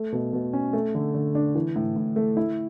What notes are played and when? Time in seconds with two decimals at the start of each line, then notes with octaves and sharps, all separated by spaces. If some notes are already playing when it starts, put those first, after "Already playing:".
Already playing: A3
0.12 B2
0.33 B2
0.53 C#4
0.73 A3
0.95 D3
1.14 D3
1.35 D4
1.55 E3
1.76 A2
1.96 A2
2.16 A3
2.37 E4